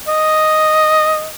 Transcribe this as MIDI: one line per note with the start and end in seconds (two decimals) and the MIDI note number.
0.08 1.29 75